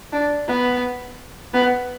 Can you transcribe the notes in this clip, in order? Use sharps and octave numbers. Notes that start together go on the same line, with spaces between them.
D4
B3
B3